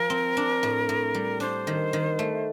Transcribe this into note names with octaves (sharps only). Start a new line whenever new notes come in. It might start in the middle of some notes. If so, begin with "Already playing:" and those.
Already playing: F3 A#4
C4
D4
A2
A2
G3
D4 C5
D#3
D#3
A3